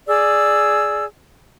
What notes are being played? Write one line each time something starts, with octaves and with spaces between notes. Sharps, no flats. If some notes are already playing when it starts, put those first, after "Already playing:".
G#4 D5 E6